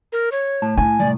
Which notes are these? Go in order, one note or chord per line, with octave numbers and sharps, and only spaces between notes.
A#4
C#5
A2 A5
E4 G#5
C2 A2 F3 D5